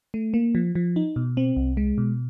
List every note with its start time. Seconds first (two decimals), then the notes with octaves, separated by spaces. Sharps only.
0.14 A3
0.34 A#3
0.55 F3
0.75 F3
0.96 D#4
1.16 B2
1.37 C4
1.56 C2
1.77 G#3
1.98 B2